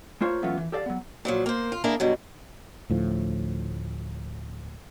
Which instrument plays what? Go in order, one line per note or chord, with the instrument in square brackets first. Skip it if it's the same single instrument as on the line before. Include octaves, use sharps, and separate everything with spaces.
[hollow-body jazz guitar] A3 A#3 F4 C5 C#5
E3 F#3 A3 B3 C#4 F4
E3
G4 A4 D5 F5
F#3 B3
[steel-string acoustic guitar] A#2 F3 F#3
A#3 C5
F4
A#3 D4 E4 G#4
G2 B2 F#3
[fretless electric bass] D2 A2 F3